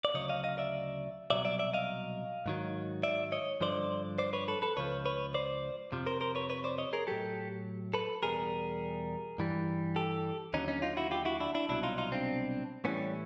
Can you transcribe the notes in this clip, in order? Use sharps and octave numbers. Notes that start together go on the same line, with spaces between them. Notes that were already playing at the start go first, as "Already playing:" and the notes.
D5
D2 C#3 F#3 C#5 D#5
D#5 F5
D#5 F5
D5 E5
C2 B2 F#3 D5 E5
D5 E5
D5 E5
D#5 F5
G#2 D#3 F#3
D5 E5
C#5 D#5
G2 D3 F3 C5 D5
C5 D5
B4 C#5
A4 B4
A4 B4
C#2 C#3 F3 B4 C#5
B4 C#5
C5 D5
F2 C3 F3
A#4 C5
A#4 C5
B4 C#5
B4 C#5
C5 D5
C#5 D#5
G#4 A#4
A2 F#3 G4 A4
A4 B4
E2 B2 G3 G#4 A#4
G2 E3 G3
G4 A4
D#2 D3 F#3 C#4 D#4
C#4 D#4
D#4 F4
E4 F#4
F4 G4
E4 F#4
D4 E4
D4 E4
C2 B2 F#3 D4 E4
D#4 F4
D#4 F4
C4 D4
A2 E3 G3 B3 C#4